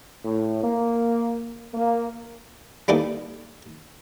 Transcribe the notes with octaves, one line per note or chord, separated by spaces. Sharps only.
A2
A#3
A#3
G3 A#3 B3 D#4 E4 A4